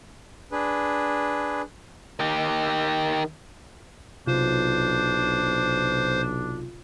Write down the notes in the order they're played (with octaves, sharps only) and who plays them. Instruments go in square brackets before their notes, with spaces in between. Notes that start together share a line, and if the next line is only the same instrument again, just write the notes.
[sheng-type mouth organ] D4 G#4 B4
[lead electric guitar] D#3 G4
[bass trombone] B1 [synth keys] C3 F4 [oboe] D4 [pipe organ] C5